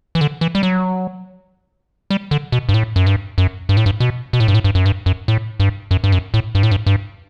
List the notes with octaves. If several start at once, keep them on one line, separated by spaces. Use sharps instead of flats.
E3
D3
E3
G3
F#3
G3
D3
B2
G2
A2
F#2
G2
F#2
G2
A2
G2
B2
B2
A2
G2
A2
G2
F#2
G2
F#2
A2
G2
F#2
G2
F#2
A2
G2
A2
G2
G2